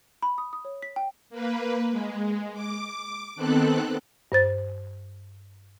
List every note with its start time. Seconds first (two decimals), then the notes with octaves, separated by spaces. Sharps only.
0.22 B5
0.38 D#6
0.53 D#6
0.65 C#5
0.82 B6
0.96 G5
1.30 A#3 B4
1.91 G#3
2.54 D6
3.36 D#3 B3 C4 A4 F#6
4.32 G2 C5 A6